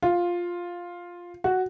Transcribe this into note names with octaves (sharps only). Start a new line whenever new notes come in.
F4
F#4